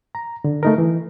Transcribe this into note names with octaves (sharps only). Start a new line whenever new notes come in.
A#5
D3
A3 D#4 A#4
E3